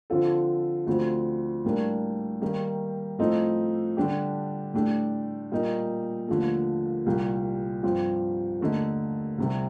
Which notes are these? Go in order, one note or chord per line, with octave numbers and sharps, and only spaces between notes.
D3 F3 C4 F4 A4
D2 D3 F3 C4
A2 G3 A#3 D4
D#3 G3 A#3
A2 F3 C4 D#4 A4
D3 G3 D4 G4
A2 A3 D4 G4
A#2 G3 A#3 D#4
D#2 D3 F3 A3
C2 A#2 G3
G2 F3 C4 G4
D#2 D3 A3 D#4
C2 C3 G3